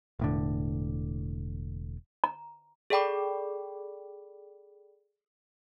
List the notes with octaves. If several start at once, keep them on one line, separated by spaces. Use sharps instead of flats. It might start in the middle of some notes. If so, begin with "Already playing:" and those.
E1 A2 D3
A#5
G#4 A4 D5 G5 B5 D6